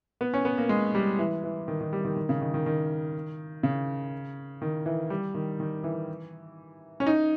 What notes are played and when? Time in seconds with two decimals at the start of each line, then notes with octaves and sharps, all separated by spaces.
0.21 B3
0.34 C#4
0.45 B3
0.58 A#3
0.69 G#3
0.95 G3
1.19 E3
1.44 E3
1.68 D#3
1.81 D#3
1.93 G3
2.05 D#3
2.16 D#3
2.29 C#3
2.41 D#3
2.54 D#3
2.66 D#3
3.63 C#3
4.62 D#3
4.86 E3
5.10 G3
5.34 D#3
5.60 D#3
5.84 E3
7.00 C#4
7.07 D#4